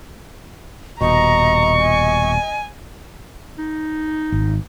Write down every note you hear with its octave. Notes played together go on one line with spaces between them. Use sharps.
D#1 B2 D#5 A#5 C#6
G#5
D#4
G#1